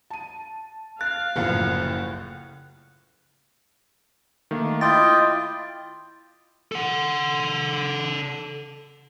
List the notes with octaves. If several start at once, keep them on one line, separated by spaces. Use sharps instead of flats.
A5 D#7
F5 F#6 A6
F#1 C2 A2 F3
D#3 A3 A#3
E4 F4 D#5 G5 D6 A6
A4 F#5